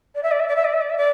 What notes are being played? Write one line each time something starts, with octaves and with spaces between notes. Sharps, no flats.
D5
E5
D5
E5
D5
E5
D5
E5
D5
E5
D5